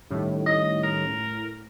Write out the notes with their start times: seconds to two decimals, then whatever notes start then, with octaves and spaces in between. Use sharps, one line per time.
0.11 A2 D#3 G3 C#4
0.46 D#5
0.83 A#4